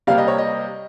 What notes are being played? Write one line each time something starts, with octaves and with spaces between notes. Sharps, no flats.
C3 G3 A#3 F5
D#5
C#5
D#5